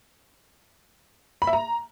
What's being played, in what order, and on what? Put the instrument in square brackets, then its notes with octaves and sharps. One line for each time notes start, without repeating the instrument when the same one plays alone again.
[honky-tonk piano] B5
E5
A#5